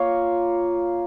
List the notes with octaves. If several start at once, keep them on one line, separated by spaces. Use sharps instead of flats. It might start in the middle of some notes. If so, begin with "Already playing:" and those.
Already playing: A#3 F4 C#5